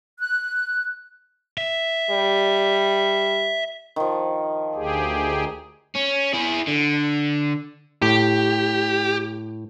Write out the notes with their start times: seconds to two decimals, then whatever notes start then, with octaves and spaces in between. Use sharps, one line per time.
0.19 F#6
1.58 E5
2.10 G3
3.96 D#3 F3
4.75 D2 G4 G#4
5.96 C#4
6.34 E4 G#4
6.68 D3
8.02 A2 G4